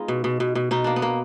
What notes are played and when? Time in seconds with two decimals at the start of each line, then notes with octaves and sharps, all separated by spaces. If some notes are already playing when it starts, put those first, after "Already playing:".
Already playing: G#3 B3 D#4 F4 G#4
0.08 B2
0.24 B2
0.40 B2
0.55 B2
0.71 B2 D#4
0.84 A#3 D4
0.96 B3
1.02 A#3